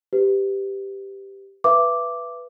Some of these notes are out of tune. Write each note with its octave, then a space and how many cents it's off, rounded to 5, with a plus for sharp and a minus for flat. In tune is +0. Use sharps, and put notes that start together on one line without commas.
G4 +0 B4 +30
B4 +0 E5 +30 D6 +0